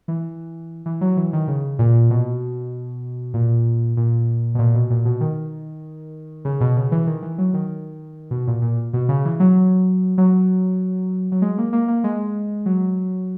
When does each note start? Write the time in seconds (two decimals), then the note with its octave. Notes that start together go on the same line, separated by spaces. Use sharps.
0.08 E3
0.86 E3
1.01 F#3
1.17 E3
1.33 D#3
1.48 C#3
1.79 A#2
2.10 B2
3.34 A#2
3.97 A#2
4.55 B2
4.59 A#2
4.75 B2
4.90 A#2
5.05 B2
5.21 D#3
6.45 C#3
6.61 B2
6.77 C#3
6.92 E3
7.07 D#3
7.23 E3
7.38 F#3
7.54 D#3
8.31 B2
8.47 A#2
8.62 A#2
8.93 B2
9.09 C#3
9.25 E3
9.40 F#3
10.18 F#3
11.32 F#3
11.42 G#3
11.58 A#3
11.73 A#3
11.88 A#3
12.04 G#3
12.66 F#3